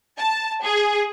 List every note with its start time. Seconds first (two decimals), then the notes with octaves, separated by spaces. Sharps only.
0.18 A5
0.64 G#4